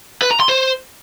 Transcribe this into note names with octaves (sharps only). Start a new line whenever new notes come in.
B4
A#5
C6
C5